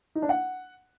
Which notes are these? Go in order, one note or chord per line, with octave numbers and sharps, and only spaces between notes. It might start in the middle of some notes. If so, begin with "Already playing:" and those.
D#4
D4
F#5